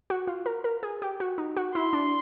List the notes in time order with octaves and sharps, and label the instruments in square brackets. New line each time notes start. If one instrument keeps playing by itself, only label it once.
[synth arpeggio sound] F#4
F4
A#4
A#4
G#4
G4
F#4
D#4
F#4
[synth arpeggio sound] E4 [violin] C6
[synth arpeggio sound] D4